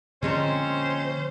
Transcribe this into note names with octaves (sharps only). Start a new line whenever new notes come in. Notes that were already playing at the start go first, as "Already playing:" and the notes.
A#2 D3 F3 G#3 A#3 C4 C#4 C5